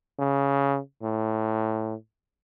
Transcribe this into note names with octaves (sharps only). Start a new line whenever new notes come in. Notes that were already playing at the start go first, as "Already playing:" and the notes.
C#3
A2